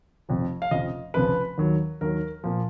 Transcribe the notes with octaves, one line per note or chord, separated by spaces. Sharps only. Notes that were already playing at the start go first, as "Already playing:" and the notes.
F1 F2 F3
F5
F1 F2 C#3 F3 D#5
F1 F2 C#3 F3 B4
D#2 D#3 F#3
D#2 D#3 F#3 A#4
A#2 F3